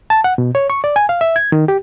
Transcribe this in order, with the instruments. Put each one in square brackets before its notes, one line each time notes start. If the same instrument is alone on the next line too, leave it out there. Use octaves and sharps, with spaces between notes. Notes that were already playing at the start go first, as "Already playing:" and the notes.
[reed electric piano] A5
F#5
B2
C#5
C#6
D5
G#5
F5
E5
G#6
D#3
G4